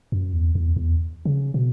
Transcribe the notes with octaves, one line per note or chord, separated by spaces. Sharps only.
F#2
E2
E2
E2
C#3
B2